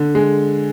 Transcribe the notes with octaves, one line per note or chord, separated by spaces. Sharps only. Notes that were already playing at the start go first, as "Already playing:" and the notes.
Already playing: D3
G#3